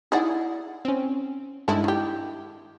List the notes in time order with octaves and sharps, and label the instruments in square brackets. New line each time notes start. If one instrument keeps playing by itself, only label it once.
[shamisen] D#4 D5 F#5 [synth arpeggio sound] E4 G#4
[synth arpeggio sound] C4 C#4
[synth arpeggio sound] G2 G#3 E4 [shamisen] D#3 A4
[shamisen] D#3 G4